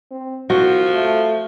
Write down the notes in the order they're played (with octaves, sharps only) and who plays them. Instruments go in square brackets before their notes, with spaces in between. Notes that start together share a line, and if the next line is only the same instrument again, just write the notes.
[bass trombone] C4
[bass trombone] C2 [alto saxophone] F3 [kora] F#4
[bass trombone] A3